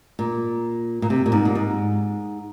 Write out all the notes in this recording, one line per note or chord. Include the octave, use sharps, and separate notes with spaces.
A#2
A#2
C3
A#2
G#2
A#2
G#2